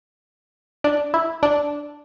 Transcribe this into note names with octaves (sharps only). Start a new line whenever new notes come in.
D4
E4
D4